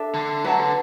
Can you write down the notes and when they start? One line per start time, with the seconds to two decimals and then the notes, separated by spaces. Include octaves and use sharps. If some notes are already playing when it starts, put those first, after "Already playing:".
Already playing: D4 A4 E5 A5
0.14 D3
0.44 F#3 B4 F#5 A5
0.60 D3